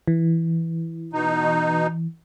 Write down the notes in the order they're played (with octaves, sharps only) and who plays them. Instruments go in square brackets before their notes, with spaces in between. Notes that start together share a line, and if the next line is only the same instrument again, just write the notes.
[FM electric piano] E3
[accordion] B2 D#4